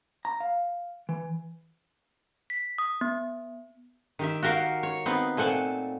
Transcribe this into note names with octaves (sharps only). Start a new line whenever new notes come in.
A#5
F5
E3
B6
D#6
B3
D#3 G4 E5
F#4 G4 A#4 F5
C#5
B3 C4 D#4 B4
A#2 A3 C4 F#5 G#5 A5